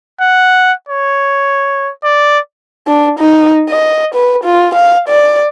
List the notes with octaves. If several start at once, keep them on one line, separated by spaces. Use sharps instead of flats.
F#5
C#5
D5
D4
D#4
D#5
B4
F4
F5
D5